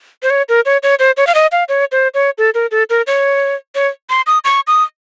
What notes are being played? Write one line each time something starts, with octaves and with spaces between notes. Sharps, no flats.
C5
C#5
A#4
C#5
C#5
C5
C#5
F5
D#5
F5
C#5
C5
C#5
A4
A#4
A4
A#4
C#5
C#5
C6
D#6
C#6
D#6